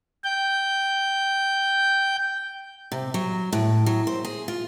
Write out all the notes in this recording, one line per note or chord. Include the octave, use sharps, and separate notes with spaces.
G5 G6
C3
F#3
A2
F#3
C5
G#4
F4